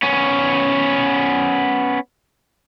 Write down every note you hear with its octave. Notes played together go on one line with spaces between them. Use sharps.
B3 C#4